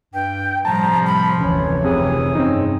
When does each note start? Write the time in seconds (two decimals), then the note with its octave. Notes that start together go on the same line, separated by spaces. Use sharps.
0.14 G2 G5
0.65 A2 C3 F3 G3 A5 A#5
1.06 B5
1.41 F1 D2 E3 C#4 C#5
1.84 C3 G#4
2.35 G2 C4 C#4 D#4